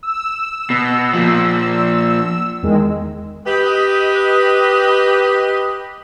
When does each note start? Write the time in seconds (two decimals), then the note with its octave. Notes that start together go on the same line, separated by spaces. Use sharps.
0.03 E6
0.70 B2
1.14 A#2 F3
2.63 E2 D#3 G#3
3.47 G4 B4 D#5